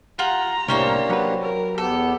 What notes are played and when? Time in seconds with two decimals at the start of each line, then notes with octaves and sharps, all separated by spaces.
0.19 F4 G4 F#5 A#5
0.68 C2 A2 A#3 C#4 D4 G4 C5 C#5
1.10 F#3 B4
1.43 A#4
1.78 E2 B3 G4 A4